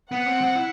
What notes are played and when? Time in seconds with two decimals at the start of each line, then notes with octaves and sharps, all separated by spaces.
0.12 B3 F#5
0.26 C4
0.41 C4
0.55 E4